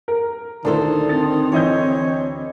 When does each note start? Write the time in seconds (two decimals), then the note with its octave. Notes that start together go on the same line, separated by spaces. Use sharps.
0.08 A#4
0.65 D2 D#3 D4 E4 A4 C5
1.09 C4 A6
1.52 E3 C#5 D#5 G6